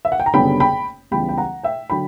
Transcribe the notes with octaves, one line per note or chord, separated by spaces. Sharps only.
E5
F#5
G5
A#5
F#1 F#2 D3 G3 B3 G5 B5
G5 B5
C#2 C#3 E3 G3 B3 G5 B5
G5
F#5 A#5
E5 G5
D3 F#3 G5 B5